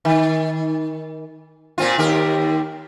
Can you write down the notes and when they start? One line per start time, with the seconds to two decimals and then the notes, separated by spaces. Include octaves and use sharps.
0.05 D#3
1.78 A#2 C4 F4
1.98 D#2 G4 A#4